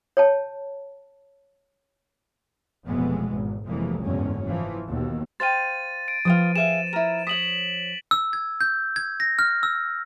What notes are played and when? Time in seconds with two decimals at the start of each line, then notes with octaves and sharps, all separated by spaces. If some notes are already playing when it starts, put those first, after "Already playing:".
0.17 C#5 G5 A5
2.87 F1 F2 B2 E3 G#3 B3
3.32 G#1
3.66 F1 F2 E3 G#3 A#3
4.03 F#1 E2 G#2 D3 C#4
4.46 E3 F3
4.88 D#2 B2
5.40 C5 F5 G5 A6 D#7
6.08 D7
6.25 F3 F4 B4 C5 G5 D#6
6.56 G#4 E5 F5 E7
6.93 E4 A#4
7.27 C#5 D#6 B6 F#7
8.11 E6
8.33 G#6
8.61 G6
8.96 G#6
9.20 A#6
9.39 F6
9.63 E6